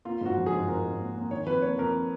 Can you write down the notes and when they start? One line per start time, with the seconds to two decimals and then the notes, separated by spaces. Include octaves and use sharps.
0.05 A#3 F4
0.21 G#2 F#4
0.37 F3
0.46 G#4
0.52 G#2
0.68 G#2 A#4
0.84 G#2
1.00 A#3
1.16 A#3
1.31 D#3 C#5
1.46 F2 B4
1.62 A#3 C#5
1.78 F2 A#4